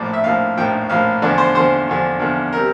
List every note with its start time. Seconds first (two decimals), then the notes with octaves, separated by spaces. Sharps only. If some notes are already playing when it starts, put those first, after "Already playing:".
Already playing: A#1 A2 F3 D5
0.14 E5
0.24 A#1 A2 F3 F5
0.57 A#1 A2 F3 G5
0.90 A#1 A2 F3 F5
1.22 E2 D3 F3 D5
1.38 C5
1.55 E2 D3 F3 C5
1.88 E2 D3 F3
2.20 E2 D3 F3
2.53 C3 G3 A#4